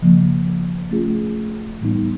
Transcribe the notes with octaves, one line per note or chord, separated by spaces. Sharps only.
C#3 F3 A#3
A3 C#4 F4 G#4
A2 E3 G3 B3 D#4